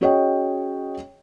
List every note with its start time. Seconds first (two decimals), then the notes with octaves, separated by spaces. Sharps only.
0.01 C#4 F#4 G#4 C#5 D#5 G5